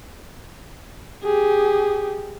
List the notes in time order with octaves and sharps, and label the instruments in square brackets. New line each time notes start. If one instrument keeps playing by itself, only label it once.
[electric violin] G4 G#4